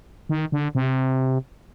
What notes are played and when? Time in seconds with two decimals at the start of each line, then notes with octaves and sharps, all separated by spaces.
0.29 D#3
0.52 D3
0.75 C3